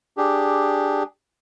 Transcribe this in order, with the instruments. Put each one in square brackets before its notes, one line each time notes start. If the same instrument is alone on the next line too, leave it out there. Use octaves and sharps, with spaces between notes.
[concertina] D4 G4 G#4